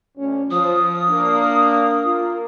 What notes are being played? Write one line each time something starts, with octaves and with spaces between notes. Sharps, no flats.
D2 C#4
F3 D#6
A#3 D4
A#3 F4